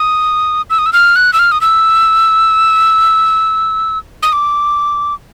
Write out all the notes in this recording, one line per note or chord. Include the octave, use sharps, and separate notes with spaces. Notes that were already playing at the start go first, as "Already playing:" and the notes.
Already playing: D#6
E6
D#6
E6
F6
F#6
E6
F6
D#6
E6
D#6
D6